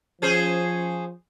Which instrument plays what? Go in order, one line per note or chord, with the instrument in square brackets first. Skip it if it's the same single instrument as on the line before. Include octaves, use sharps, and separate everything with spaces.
[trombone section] F3 [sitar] C#4 G#4 C5